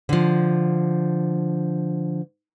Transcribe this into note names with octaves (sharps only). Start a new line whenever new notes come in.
D3 F3